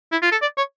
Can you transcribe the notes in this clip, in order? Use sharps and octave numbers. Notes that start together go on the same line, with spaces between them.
E4
F4
A4
D5
C#5